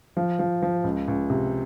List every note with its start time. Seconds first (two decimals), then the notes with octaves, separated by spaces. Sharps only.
0.17 F3
0.39 F3
0.62 F3
0.84 C#2
1.08 C#2
1.30 C3